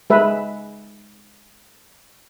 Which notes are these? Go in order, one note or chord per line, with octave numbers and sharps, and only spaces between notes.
G#3 G#4 B4 E5